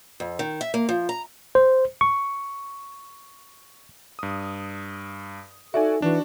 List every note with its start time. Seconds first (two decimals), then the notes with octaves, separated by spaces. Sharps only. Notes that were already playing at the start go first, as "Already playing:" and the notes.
0.20 F2
0.39 D#3
0.61 E5
0.74 A#3
0.89 F3
1.09 A#5
1.55 C5
2.01 C#6
4.19 G2 D#6
5.74 D#4 F#4 A4 D5 E5 G#5
6.02 E3 D4 F#4